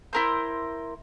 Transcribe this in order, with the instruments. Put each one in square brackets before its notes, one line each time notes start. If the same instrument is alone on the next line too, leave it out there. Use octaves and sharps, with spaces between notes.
[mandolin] E4 A#4 C5